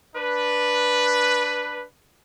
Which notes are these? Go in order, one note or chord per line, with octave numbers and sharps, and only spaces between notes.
D4 B4